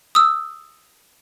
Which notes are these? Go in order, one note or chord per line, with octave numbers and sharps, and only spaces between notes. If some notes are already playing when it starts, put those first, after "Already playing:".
D#6 E6